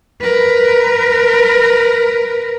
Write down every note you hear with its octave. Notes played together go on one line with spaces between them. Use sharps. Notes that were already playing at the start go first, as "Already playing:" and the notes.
A#4 B4